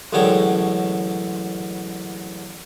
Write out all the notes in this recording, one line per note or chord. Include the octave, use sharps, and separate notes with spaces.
A1 F#2 D3 G#3 C#5 G5